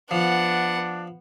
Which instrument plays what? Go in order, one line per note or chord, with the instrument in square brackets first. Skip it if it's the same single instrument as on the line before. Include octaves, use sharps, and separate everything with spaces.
[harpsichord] F3 [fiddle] B3 F#5 [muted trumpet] D4